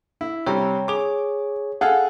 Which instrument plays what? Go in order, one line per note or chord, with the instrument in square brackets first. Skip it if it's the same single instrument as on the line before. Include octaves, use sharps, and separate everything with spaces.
[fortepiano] E4
[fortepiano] C3 G3 [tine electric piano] C#5 G5 A#5
[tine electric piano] G#4 C#5 [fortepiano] D6
[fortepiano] G#4 A4 F5 [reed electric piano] F#5